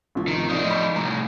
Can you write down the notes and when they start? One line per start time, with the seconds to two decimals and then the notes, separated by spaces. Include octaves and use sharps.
0.15 A1 C3 F3
0.28 D#3
0.49 A2 F3 D#4 D5 D#6
0.71 B5 C#6 B6
0.96 C2 A2 A#5